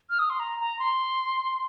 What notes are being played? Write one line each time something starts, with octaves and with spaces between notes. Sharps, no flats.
F6
D#6
C6
A#5
A#5
C6